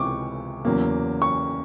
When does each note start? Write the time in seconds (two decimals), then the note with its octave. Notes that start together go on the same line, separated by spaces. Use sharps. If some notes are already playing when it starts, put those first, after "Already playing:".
Already playing: C#2 C3 E3 C#6 D6
0.65 E2 C#3 F#3 A#3
1.22 C#6